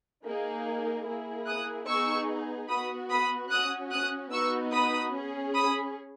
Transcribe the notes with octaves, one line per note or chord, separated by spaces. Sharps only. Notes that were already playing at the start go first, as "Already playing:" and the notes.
A#3 D#4 G#4
A#3 E4 G#4
D#6 F#6
B3 D#4 G#4 C#6 E6
B3 F#4 B5 D#6
B5 D#6
C#4 F#4 D#6 F#6
D#6 F#6
B3 D#4 F#4 C#6 E6
B5 D#6
C#4 G#4
B5 D#6